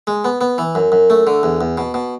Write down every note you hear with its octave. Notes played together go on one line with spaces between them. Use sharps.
G#3
B3
B3
E3
F#2
F#2
A3
D3
E2
E2
B2
B2